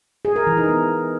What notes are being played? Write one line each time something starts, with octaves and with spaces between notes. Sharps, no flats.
G#4
A#4
E3
D#4
B3